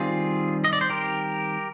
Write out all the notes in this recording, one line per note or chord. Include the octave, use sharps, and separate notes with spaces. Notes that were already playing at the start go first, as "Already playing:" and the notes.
Already playing: D#3 G3 C4 F4 G#4
D#5
D5
C5
G4 A#4